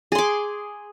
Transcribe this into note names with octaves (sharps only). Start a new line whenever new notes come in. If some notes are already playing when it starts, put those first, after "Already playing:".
G#4 C6 D6